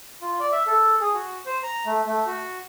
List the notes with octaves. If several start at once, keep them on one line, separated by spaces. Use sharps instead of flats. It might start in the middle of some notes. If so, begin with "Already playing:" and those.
F4
D5
E5
A4
G#4
F#4
C5
A#5
A3
A3
F#4